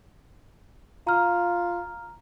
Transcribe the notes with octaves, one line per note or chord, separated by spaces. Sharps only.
F4 A#5 F6